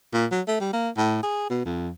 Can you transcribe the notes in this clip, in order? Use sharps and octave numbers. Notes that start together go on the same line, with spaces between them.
A#2
F#3
A3
G3
A#3
A2
G#4
B2
F2